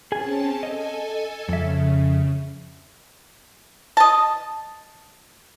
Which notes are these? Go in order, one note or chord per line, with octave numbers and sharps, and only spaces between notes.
C4 C#4 G#4 G#5 A5
A4 D#5 G#5
F2 C#3 E5
D#5 A5